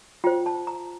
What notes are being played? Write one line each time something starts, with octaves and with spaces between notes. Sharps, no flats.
F4 C5 G5
A5
A#5